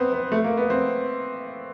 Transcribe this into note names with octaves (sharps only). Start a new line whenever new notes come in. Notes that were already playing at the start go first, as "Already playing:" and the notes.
Already playing: B3 C4
B3
A3
A#3
B3
C4